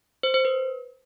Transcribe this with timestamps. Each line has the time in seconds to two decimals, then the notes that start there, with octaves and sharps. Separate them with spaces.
0.23 C5
0.34 C5
0.45 B4